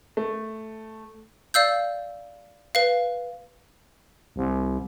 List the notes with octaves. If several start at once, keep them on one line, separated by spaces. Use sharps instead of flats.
A3
D5 F5 E6 G6
B4 F5
C2